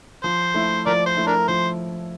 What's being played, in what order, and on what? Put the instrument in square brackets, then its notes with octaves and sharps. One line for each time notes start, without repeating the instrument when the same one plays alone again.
[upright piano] F3 [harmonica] C5
[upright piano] A3 E4
[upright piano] F3 [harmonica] A#4 D5
[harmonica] C5
[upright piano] A3 E4
[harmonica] D4 A#4
[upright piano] F3 [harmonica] C5